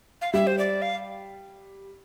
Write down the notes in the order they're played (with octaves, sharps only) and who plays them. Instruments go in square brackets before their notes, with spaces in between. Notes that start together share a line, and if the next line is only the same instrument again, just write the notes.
[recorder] F5
[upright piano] G3 [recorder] E5
[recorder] C5
D5
F5